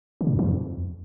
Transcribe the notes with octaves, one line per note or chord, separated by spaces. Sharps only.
D3
A#2
F2
E3
F2